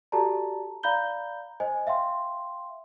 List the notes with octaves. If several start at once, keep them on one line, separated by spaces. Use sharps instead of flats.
F#4 G4 A4 D5 A5 A#5
D5 F5 A#5 B5 G6 G7
C5 D#5 G#5
E5 F5 G5 C6